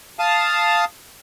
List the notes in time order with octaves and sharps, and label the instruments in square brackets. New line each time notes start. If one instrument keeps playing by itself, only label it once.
[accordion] F5 A5 D#6